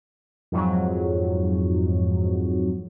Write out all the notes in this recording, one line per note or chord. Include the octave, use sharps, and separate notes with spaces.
F2 G#2 F#3